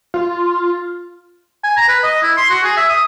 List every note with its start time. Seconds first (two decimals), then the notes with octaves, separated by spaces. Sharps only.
0.14 F4
1.64 G#5
1.77 A#5
1.88 B4
2.03 D#5
2.22 E4
2.37 C6
2.50 F#4
2.63 G#4
2.77 E5
2.89 D#6